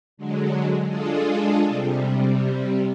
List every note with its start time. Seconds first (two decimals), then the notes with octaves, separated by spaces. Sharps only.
0.17 D3 F#3 G#3
0.88 G#3 D4 F4 G#4 A4
1.66 C3 G3